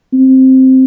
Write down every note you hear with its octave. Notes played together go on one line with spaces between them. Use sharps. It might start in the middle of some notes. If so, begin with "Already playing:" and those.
C4